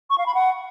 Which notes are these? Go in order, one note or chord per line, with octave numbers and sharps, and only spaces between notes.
C#6
F5
B5
F#5